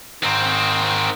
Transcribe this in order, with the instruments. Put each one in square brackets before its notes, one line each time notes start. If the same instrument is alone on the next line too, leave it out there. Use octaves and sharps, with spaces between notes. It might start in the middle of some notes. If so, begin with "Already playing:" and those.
[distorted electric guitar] D#2 C4 [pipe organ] G#2 D#3